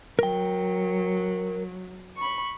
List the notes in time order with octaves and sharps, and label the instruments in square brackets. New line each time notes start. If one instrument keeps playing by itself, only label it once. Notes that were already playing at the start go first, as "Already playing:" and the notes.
[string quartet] F#3 [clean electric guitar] A#4 G5
[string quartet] B5 C#6